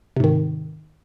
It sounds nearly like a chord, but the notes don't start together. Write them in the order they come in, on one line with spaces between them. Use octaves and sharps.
C3 G#2 D#3